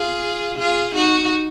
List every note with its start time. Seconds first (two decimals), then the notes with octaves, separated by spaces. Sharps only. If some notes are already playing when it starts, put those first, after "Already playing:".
Already playing: F4 G#4
0.59 F4 G#4
0.95 D#4 F#4